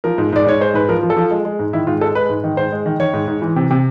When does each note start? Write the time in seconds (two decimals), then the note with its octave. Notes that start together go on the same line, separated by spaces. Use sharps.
0.04 F3 A#4
0.18 G#2
0.33 G#2 D5
0.46 G#2 C#5
0.60 G#3 C5
0.74 G#2 B4
0.89 F3 A#4
1.03 F3
1.10 A4
1.16 F3
1.31 G#3
1.45 G#3
1.59 G#2
1.73 D#3 E4
1.87 G#2 F4
2.01 G#3 A4
2.15 G#3 B4
2.29 G#2
2.43 D#3
2.57 G#2 C5
2.72 G#3
2.86 D#3
2.99 D#3 C#5
3.14 G#2
3.28 G#2
3.42 E3
3.56 C3
3.71 C3